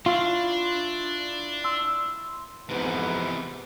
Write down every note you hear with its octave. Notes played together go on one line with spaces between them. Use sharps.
D4 E4 F4 C#6
C6 E6
F2 G#2 C3 E3 B3